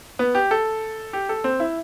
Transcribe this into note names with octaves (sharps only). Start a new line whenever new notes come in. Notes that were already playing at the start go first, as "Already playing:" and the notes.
B3
G4
A4
G4
A4
C4
E4